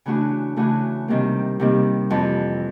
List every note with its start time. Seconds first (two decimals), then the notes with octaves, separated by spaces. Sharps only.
0.06 C#3 E3 A3 D4 F#4
0.56 C#3 E3 A3 D4 F#4
1.08 C3 D#3 G3 A#3
1.60 C3 D#3 G3 A#3
2.10 F2 C3 E3